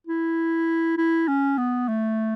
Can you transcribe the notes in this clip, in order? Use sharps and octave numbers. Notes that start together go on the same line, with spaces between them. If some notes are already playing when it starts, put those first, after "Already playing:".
E4
E4
C#4
B3
A3